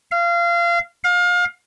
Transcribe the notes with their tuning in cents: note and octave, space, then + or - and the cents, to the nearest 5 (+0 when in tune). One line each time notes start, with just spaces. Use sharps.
F5 -25
F5 +30